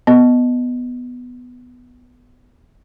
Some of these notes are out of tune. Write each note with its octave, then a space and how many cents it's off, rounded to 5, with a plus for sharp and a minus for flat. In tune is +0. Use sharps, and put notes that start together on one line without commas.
B3 +5 D#5 +0